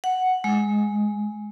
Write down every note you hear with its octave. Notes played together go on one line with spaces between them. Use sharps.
F#5
G#3